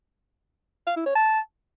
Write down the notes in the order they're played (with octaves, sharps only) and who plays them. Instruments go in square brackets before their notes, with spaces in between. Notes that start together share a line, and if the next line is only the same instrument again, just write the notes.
[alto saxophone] F5
E4
C#5
A5